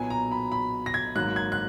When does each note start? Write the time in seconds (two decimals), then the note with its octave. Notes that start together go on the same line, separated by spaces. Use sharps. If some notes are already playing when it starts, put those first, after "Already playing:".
Already playing: B1 A#2 F#3 B3 G#5
0.10 A#5
0.31 B5
0.52 B5
0.86 A#6
0.94 G#6
1.15 G#1 G#2 F#3 A#3 F#6
1.36 G#6
1.52 F#6